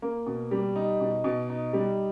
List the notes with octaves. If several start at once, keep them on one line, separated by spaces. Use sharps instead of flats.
A#3
B2
G3
D#4
B2
B2
D#4
G3